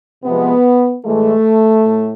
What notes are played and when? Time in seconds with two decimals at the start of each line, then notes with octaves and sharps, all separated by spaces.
0.25 C3 F3 G#3 B3
1.05 A2 E3 G#3 A3
1.85 A2